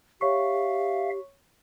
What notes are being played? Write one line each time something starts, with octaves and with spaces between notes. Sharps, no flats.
G4 C#5 E5 F5 C#6